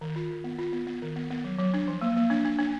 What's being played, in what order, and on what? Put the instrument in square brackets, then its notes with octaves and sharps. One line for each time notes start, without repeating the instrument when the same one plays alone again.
[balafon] D#3
F4
D#3
B3
F4
B3
B3
D#3
B3
B3
F#3
F#3
D4
F3
A#3
A#3
D4
D4
D4